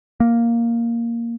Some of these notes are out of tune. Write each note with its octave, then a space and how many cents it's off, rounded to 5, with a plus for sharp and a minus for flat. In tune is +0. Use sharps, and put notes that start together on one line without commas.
A#3 +0